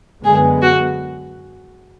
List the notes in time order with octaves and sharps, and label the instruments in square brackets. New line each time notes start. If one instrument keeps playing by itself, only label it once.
[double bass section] F#2 D3 G#3 B3 [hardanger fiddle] G#4
[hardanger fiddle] F#4